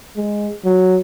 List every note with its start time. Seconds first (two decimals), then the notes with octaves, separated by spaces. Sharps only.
0.16 G#3
0.65 F#3